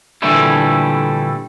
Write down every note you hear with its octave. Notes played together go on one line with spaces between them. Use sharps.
A#2 D3 E3 G3 A3 E4